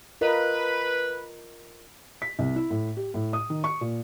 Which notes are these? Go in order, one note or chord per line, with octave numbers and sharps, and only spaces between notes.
F4 A#4 B4 D#5
B6
C2
E4
A2
G4
A2
D#6
D#3
C#6
A#2